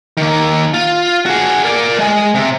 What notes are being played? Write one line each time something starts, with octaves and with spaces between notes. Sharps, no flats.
D#3 A#3
F4
F#4 G#4
A#4 D5
G#3 G#5
C3